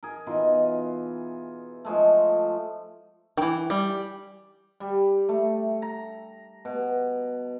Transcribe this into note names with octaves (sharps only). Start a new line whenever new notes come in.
G#4 A#4
B2 E3 D#4 F4
F3 G#3 A3
D#3 E3
G3
G3
A3
A#5
B2